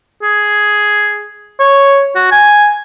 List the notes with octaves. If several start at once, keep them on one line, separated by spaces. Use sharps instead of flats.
G#4
C#5
F#4
G#5